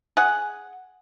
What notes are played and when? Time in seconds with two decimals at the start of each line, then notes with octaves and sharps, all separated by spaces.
0.17 G#4 F#5